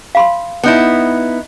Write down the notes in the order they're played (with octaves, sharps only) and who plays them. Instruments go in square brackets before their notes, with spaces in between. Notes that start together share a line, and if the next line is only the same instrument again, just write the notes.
[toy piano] F5 B5 C6
[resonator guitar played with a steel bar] B3 D#4 E4